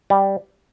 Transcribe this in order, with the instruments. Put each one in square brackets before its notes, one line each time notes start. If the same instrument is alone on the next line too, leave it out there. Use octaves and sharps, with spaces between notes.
[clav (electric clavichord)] G3